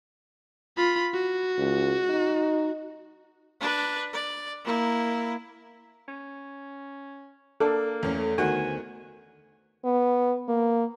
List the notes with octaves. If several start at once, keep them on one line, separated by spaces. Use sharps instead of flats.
F4 B5
F#4
C#2
D#4
D4 B4
D5
A#3 E4
C#4
A#3 D4 A4
E2 A3 C#4
D2 D#3 B3 F#4 C5 G#5
B3
A#3